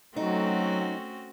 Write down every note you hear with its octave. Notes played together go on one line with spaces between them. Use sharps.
F#3 A3 C4 C#4 D#4 F#4